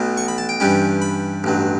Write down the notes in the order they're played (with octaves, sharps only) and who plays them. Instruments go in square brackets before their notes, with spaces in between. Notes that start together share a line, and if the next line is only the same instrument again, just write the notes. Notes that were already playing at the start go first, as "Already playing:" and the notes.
Already playing: [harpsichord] B1 B2 F#3 A3
C#6
B5
A5
G5
G2 E3 G3 C#4
B5
A1 G2 F#3